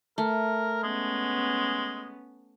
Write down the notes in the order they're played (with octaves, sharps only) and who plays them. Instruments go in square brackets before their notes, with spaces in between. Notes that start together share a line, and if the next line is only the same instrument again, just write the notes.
[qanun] A3 [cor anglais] A#4
[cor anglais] G#3 [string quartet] B3 C#4